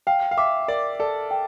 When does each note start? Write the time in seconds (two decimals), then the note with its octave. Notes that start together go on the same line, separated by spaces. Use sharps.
0.07 F5 G5
0.31 F5
0.37 E5 D6
0.68 A#4 D5
0.99 A4 D5
1.31 G5